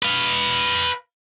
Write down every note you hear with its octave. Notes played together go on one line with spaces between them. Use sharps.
B4 F5